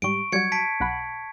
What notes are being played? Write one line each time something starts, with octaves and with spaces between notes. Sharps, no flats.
G#2 G3 C#6 D7
F#3 G3 F#4 G#6 C#7
A5 B6 D7
B1 F#5 B5